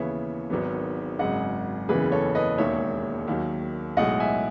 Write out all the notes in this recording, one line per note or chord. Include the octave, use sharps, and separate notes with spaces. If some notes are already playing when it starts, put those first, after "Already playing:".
Already playing: D#2 C#3 E3 B3 C#5 E5
G#1 G#2 D#3 F#3 B3
G#1 F#2 C#3 G#3 D#5 F#5
F#1 E2 C#3 E3 G#4 B4
A4 C#5
B4 D#5
E1 D#2 D#3 G#3 C#5 E5
D#2 D#3 F#3
B1 A2 G#3 D#5 F#5
E5 G#5